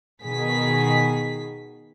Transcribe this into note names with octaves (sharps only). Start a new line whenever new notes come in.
B2 D#3 G#4 B6